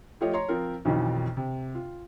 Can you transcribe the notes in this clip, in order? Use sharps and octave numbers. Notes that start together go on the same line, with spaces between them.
F3 A3 F4 G4 C#5 D#5
C#5 A#5 C6
F3 C4 F4 A#4
B1 F2 B2 D#3 E3
C3
F4